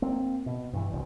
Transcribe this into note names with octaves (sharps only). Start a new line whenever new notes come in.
A#3 C4
B2
G2 E3
E1 C2